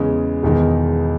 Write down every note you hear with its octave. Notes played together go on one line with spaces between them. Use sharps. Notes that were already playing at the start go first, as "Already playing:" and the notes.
Already playing: E2 C#3 G#3
E1 E2 D#3 G#3